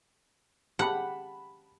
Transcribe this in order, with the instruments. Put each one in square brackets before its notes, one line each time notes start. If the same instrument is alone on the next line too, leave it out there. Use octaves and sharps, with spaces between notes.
[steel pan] G4 [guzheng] F#5 [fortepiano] A5 B5